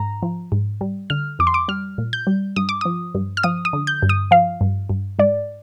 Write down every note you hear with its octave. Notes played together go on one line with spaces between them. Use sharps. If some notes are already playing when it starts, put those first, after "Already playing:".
Already playing: G#2 A#5
F3
G#2
G3
D3 F6
F2 D6
C6
D6
G3 F6
A#2
G6
G3
G2 D#6
D6
F3 D#6
G2
F6
F3 D#6
D#6
D3
G6
G2
D#6
F3 F5
G2
G2
G#2 D5